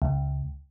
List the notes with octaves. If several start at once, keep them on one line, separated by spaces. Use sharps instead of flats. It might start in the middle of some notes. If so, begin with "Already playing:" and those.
C#2